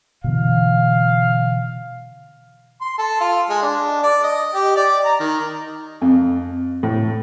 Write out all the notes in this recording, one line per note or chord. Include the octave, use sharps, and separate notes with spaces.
B2 D3 E3 F5
C6
A4
F4
G#3
D4
D5
D#5
G4
D5
A#5
D#3
F2
A2